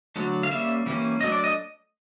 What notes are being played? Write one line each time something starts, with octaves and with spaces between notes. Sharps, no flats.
D3 F#3 A3
F5
G3 A#3 C#4 E5
E3 G3 A#3 C#4
F#3 A3 D4 D#5
D5
D#5